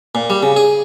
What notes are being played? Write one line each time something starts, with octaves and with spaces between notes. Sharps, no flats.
A#2
G3
C#3
G#4